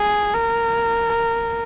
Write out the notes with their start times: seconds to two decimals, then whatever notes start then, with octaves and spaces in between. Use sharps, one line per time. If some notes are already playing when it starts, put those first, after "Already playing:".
Already playing: G#4
0.34 A#4